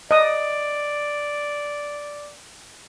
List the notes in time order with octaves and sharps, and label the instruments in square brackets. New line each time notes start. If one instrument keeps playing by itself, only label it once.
[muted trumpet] D5 [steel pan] D#5 D#6